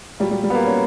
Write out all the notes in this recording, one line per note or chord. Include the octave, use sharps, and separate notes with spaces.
A#2 F#3 G3
G3
G3
B3
A#3
C#4